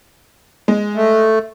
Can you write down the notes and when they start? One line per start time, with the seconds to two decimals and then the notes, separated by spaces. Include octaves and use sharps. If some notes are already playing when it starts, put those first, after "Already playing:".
0.68 G#3
0.95 A3